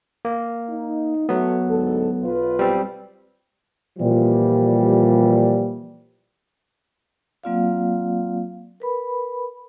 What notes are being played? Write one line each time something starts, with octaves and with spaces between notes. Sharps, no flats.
A#3
D#4
F#3 A3 B3
D2 G#2 A4
B1 F4 B4
G3 C4
A#2 E3 F3 G3
F#3 A#3 C4 F4 D5 F5
A#4 B4 B5